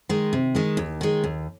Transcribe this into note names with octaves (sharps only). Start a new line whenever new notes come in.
D#3 G#3
C3
D#3 G#3
D#2
D#3 G#3
D#2